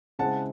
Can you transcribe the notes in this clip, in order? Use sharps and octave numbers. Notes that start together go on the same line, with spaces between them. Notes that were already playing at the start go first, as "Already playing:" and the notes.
C#3 G#3 C4 E4 F#5 A5